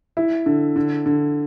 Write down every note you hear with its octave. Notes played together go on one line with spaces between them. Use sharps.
E4
D3
D3
D3